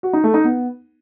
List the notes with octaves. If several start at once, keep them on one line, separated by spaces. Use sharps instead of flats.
F#4
D#4
A3
D#4
B3